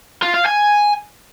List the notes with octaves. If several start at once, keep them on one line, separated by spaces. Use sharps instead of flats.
F4
F5
G#5